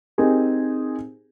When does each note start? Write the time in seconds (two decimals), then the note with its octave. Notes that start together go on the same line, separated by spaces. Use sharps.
0.18 C4 D#4 G4 G#4 A#4